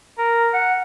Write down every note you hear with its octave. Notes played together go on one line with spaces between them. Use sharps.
A#4
F#5